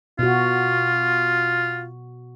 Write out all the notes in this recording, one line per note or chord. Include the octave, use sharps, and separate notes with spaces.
B2 F4 F#4